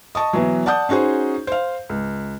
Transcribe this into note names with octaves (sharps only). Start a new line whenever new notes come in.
D#5 A5 C#6 D#6
B2 E3 F#3
D5 F#5 A5 D#6 G6
C#4 D#4 F#4 G#4 C5
C5 F5
C#2